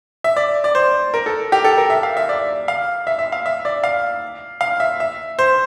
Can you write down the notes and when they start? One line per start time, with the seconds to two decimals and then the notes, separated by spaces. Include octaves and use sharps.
0.24 E5
0.36 D5
0.64 D5
0.75 C5
1.14 A#4
1.26 A4
1.52 G4
1.64 A4
1.77 A#4
1.90 E5
2.03 F5
2.17 E5
2.29 D5
2.68 F5
3.07 E5
3.19 E5
3.32 F5
3.46 E5
3.65 D5
3.84 F5
4.61 F5
4.80 E5
5.00 E5
5.39 C5